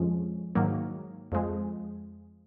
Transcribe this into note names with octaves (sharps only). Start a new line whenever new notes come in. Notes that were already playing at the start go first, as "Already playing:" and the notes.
Already playing: F2 F3 G#3 C#4
G#2 D#3 F#3 A#3
F2 F3 G#3